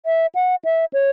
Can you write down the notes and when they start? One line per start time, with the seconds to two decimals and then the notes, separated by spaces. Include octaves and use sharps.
0.06 E5
0.35 F#5
0.65 E5
0.93 C#5